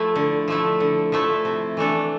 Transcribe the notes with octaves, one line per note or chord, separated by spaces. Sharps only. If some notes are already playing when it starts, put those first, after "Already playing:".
Already playing: F3 A3 E4
D3
F3 A3 E4
D3
F3 A3 E4
C3
E3 A3 D4 A4